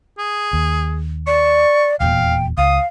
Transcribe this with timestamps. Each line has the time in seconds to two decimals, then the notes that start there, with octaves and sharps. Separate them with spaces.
0.18 G#4
0.53 D#2
1.27 D5 C#6
2.00 D#1 E2 A#2 F5 G5
2.58 C#2 F5 D#6